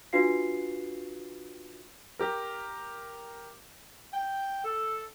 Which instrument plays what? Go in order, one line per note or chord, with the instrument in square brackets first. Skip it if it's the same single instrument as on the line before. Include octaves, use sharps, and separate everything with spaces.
[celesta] D4 F4 F#4 B4 F5 C7
[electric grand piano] G4 A#4
[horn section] G5
A4